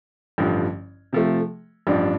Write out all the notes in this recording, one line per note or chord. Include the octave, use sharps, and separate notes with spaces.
A1 G2 D3 F3
C3 F3 A3
A1 G2 F3 D4